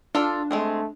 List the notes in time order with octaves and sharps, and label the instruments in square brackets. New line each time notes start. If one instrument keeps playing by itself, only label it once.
[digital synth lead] D4 [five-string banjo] F4 A4 D5
[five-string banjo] G#3 C4 G#4 [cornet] A3